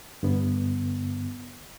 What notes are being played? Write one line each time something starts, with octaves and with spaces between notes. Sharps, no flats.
G2 D3 B3